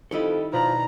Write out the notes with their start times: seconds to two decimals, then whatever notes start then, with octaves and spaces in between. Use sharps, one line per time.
0.11 F2 D#3 G3 E4 A4 D#5
0.53 B2 F3 B4 D5 A#5